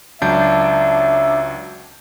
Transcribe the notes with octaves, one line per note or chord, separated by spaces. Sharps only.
C#2 F#3 D4 E5 G6